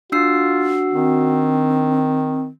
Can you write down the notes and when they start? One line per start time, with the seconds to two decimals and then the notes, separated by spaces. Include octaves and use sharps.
0.12 D4 F4 F#4 E6 C7
0.92 D#3 C4